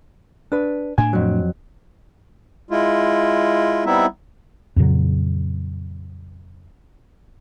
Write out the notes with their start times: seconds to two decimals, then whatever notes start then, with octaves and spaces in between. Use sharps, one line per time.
0.52 D4 B4
0.98 A2 D4 G#5
1.13 F2 F#3
2.71 G#3 E4 F4
3.85 G3 B3 C4 D#4 E4 E5
4.76 F2 A#2 C#3 F#3